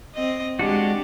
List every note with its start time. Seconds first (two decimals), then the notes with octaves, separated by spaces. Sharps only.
0.15 C4 D#5
0.59 G#3 D4 F#4 G4